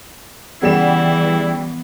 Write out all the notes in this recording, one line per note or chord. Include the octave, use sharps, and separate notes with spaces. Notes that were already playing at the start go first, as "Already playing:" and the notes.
C#3 E3 G3 B3 E4 E7